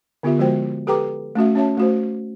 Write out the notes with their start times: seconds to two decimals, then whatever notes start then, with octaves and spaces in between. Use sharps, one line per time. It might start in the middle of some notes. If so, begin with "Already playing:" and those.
0.23 D3 B3 F4 G4 E5
0.38 D3 F3 G#3 F#4 C5 G5
0.87 G4 A4 B4 G5 A#5 D6
1.35 A3 C#4 F#4 E5
1.55 C#4 F#4 C#5 E5 A5
1.77 A3 F#4 C5